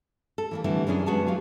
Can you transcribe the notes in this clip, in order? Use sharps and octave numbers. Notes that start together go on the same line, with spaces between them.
A4
E3 G3 A#3
D3 E3 G3 A3 C4
F#2 E3 C#4 D4 G#4
G#3 B3 F#4 G#4 A5
F#3 F4 G4 F5